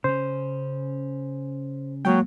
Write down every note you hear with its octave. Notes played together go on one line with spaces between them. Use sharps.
C#3 C#4 C5
F#3 G#3 A#3 G5